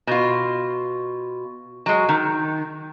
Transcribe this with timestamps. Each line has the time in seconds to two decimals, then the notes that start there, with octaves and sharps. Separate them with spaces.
0.07 B2 F4
1.86 F#3 G#3
2.09 D#3